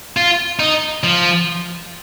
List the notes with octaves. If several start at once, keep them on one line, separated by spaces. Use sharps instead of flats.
F4
D#4
F3